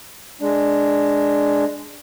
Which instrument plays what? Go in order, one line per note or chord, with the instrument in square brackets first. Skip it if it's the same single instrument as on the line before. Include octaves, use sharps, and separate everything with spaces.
[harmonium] G#3 D4